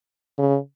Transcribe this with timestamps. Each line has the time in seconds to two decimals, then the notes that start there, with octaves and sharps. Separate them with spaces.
0.39 C#3